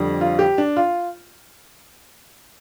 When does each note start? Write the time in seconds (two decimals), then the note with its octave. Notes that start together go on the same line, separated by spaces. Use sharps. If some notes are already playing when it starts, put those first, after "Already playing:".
Already playing: F2 D3 G3
0.21 F4
0.39 G4
0.58 D4
0.77 F4